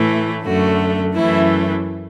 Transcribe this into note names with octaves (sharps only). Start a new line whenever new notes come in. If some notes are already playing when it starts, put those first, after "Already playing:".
Already playing: A2 E3 A3
F#2 D3 A3 F#4
F#2 E3 A3 E4